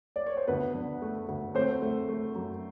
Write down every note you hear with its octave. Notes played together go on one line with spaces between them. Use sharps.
D5
C#5
C5
D2 B3 B4
D3
A3
D2
A3 C4 C5
A3
A3
F#2